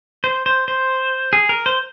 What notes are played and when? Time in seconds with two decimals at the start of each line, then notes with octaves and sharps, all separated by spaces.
0.24 C5
0.46 C5
0.68 C5
1.33 G#4
1.49 A#4
1.66 C5